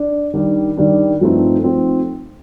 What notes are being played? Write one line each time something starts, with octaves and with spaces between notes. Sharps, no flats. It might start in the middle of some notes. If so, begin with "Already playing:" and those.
Already playing: D4
D#3 G3 D4
D#3 G3 D4
G2 F3 A3 C4 D#4
F3 A3 C4 D#4